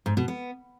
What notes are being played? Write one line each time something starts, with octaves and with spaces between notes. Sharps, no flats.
G#2
B2
B3